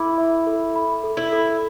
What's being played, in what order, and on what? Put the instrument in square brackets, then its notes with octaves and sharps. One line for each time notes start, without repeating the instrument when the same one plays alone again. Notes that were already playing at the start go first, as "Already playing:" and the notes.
Already playing: [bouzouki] E4 [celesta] A4 B5 D6
[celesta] E5
A4
B5
A4
[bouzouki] E4
[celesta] A4